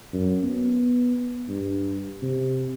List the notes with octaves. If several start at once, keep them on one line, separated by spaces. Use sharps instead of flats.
F#2
B3
G2
C3